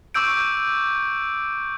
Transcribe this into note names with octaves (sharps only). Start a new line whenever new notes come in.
C#6 D6 E6 G6 D7